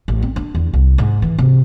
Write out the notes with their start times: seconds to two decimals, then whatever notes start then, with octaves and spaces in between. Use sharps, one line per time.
0.08 A1
0.22 C4
0.36 D4
0.55 E2
0.74 C2
0.98 G#2
1.22 E3
1.38 C3